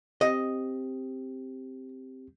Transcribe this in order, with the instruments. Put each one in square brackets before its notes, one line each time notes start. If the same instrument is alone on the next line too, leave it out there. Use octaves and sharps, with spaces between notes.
[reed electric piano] C4 G4 [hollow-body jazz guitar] D#5